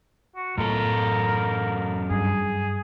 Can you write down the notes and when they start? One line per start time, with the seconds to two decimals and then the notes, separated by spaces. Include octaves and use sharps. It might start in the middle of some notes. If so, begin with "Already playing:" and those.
0.36 F#4
0.57 F#2 A2 A4 A#4
2.10 G2 G#4